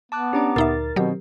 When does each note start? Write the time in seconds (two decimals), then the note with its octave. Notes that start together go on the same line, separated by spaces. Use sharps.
0.12 B3 A5 D6 F#6
0.33 C#4 D4 G4 D5 A#5 D6
0.56 D2 A#2 D#4 A#4 E5 A6
0.96 B2 D#3 F#3 C4 G4